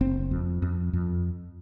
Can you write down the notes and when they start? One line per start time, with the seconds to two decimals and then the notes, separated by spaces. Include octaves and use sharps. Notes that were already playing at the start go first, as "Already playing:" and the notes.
0.01 F#1 C4
0.31 F2
0.62 F2
0.93 F2